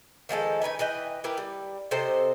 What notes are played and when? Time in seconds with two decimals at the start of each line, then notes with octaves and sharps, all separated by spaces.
0.29 D#3 F3 G#3 A4
0.62 C#4 D#4 B4 G#5
0.79 E3 B4 D#5 G5
1.24 E4 G4 A#4 B4
1.37 G3
1.91 C3 A4 C5 D#5